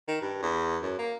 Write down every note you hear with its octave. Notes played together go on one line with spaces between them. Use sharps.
D#3
G2
E2
F#2
A#3